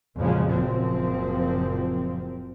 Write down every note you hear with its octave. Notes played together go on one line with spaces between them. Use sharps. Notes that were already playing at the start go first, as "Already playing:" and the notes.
F2 A#2 C#3 F3 F#3 G#3
F#1 A#2 F3 C4